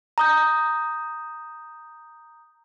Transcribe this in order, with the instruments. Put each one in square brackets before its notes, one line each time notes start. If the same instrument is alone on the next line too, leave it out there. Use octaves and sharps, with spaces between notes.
[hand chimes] A#5 D#6 G6